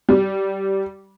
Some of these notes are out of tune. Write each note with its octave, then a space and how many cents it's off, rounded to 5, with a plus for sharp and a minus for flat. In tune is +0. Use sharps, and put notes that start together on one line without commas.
G3 -15